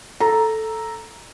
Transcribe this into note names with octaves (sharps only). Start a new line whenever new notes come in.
A4 A#5